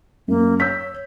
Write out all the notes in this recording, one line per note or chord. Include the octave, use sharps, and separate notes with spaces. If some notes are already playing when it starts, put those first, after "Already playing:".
F#2 A#3
C#5 E6 G6 B6